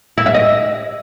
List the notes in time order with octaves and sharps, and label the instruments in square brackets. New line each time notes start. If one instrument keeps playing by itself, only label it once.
[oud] E4
E5
D#5